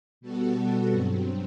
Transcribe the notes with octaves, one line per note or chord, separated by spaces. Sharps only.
B2 G3 B3 F#4 A4
G2 F#3 C4